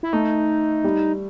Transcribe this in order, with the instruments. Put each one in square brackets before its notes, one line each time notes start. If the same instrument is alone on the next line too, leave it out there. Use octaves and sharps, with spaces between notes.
[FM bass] E4
[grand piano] A3 [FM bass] D#4
[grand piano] G3